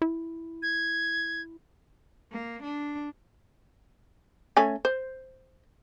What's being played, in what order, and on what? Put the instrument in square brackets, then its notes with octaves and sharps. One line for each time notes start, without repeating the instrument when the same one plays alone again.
[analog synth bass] E4
[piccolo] G#6
[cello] A#3
D4
[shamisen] A3 C#4 G#5
C5